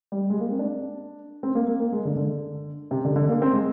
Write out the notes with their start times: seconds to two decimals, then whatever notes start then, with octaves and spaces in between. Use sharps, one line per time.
0.12 G3
0.30 G#3
0.40 A#3
0.50 C4
0.59 D4
1.43 C4
1.55 A#3
1.67 A#3
1.80 A#3
1.92 G#3
2.05 D3
2.16 D3
2.91 C3
3.05 D3
3.16 D3
3.29 A#3
3.42 C4
3.53 G#3